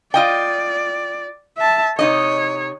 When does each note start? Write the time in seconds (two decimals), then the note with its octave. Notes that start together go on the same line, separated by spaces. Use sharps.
0.14 F4 D5 D#5 G5
1.58 E5 A5
1.99 C3 D#4 C#5 D#5